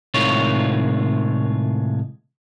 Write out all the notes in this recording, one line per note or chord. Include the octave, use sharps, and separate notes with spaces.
A2 C3 D#3 G#3 F4 C#5